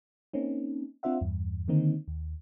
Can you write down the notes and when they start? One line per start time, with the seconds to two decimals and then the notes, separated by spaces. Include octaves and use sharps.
0.33 A#3 C4 C#4 D#4
1.03 C4 D4 F4 C5 E5 F#5
1.21 E2 G2
1.68 D3 D#3 A#3 C4 D#4
2.08 D#2